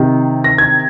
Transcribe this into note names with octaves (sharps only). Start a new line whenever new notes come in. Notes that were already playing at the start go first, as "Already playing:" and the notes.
Already playing: C3 D#3
A#6
G#6